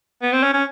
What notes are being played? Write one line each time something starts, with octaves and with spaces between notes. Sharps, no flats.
B3
C4
C#4
C#4